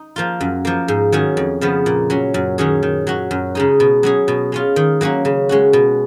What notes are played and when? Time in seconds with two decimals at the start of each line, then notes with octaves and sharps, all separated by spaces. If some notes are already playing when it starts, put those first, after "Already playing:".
Already playing: D#4
0.16 F3 A#3 F4
0.41 F#2
0.65 F3 A#3
0.88 G#2
1.12 D#3 F#3 C#4 G#4
1.37 F2
1.61 C#3 F3 B3
1.86 A#2
2.10 F#3 C#4
2.34 F#2
2.58 D#3 F#3 C#4 G#4
2.83 D#3
3.07 F#3 C#4 F#4
3.31 F#2
3.55 C#3 G#3 D#4
3.80 B2
4.03 F#3 C#4 G#4
4.28 B2
4.52 G#3 C#4 F4
4.76 D#3
5.01 F#3 A#3 C#4 F#4
5.25 C#3
5.49 G#3 C#4 F#4
5.73 B2